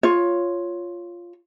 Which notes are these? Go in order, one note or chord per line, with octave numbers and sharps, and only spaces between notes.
F4 C#5